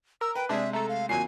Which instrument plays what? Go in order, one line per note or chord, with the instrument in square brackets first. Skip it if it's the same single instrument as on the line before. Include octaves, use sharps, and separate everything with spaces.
[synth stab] A#4 [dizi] E6
[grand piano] B4 [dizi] G5
[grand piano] C3 G#3 [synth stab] D4 G#4 [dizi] E5
[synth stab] A3 A4 [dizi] A#5
[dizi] F5
[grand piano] G#1 C7 [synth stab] A#2 F#3 [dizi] G#5